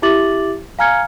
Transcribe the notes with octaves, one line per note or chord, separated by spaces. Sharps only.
E4 G4 E5 D6 A6 F#7
F5 G#5 A#5 F6 G#6 C#7